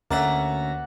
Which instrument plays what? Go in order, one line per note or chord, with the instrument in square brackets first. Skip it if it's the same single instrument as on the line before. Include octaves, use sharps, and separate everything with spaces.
[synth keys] D2 A6 A#6 [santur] A#3 F#5 [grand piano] C#4 E5